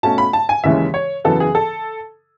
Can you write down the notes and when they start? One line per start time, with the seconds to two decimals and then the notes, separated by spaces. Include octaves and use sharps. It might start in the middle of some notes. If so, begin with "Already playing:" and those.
0.03 B2 A3 C#4 A5
0.18 B5
0.33 A5
0.49 G#5
0.63 D#2 C#3 E3 G#3 C#4 E5
0.94 C#5
1.24 F#2 C#3 E3 B3 A4
1.40 G#4
1.55 A4